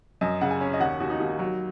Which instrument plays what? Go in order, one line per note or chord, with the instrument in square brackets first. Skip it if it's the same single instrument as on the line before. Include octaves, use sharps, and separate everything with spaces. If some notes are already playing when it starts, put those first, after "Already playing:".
[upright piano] F#2 D#5
C#3 F#5
G#5
C#4
D#5
D#2 F#5
D#2 F#4
D#4
D#2
F#3